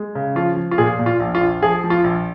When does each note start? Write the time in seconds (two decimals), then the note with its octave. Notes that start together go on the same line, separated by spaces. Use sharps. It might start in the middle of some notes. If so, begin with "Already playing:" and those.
Already playing: G#3
0.15 C#3
0.35 F3 F4
0.57 F3
0.71 F4
0.78 A#2 G#4
0.99 A#2
1.06 F4
1.20 A#1
1.35 F4
1.41 A#1
1.62 F3 G#4
1.84 F3
1.90 F4
2.04 A#1